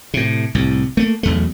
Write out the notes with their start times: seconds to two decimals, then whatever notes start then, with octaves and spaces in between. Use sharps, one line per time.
0.14 A2 C3
0.55 C2 A2
0.97 A3 A#3
1.23 B1 E2 A3